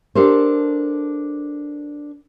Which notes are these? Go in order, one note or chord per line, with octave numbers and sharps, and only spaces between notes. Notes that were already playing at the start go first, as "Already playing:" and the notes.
D4 G4 A4 A#4 C5